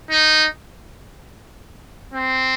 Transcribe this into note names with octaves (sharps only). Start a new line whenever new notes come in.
D#4
C4